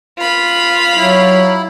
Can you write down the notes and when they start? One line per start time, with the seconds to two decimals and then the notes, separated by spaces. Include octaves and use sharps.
0.19 F4 B5
0.97 F#3 E4